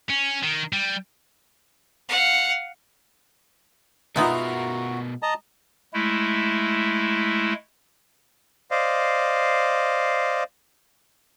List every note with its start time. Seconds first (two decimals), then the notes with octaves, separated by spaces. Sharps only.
0.09 C#4
0.43 D#3
0.73 G3
2.09 F5 F#5
4.16 B2 G#3 B3 D#4 F4 A#4 E5 A#5
4.32 F#4
5.22 D#5 A5 A#5
5.94 G#3 A3 E4
8.71 C5 D5 D#5 F5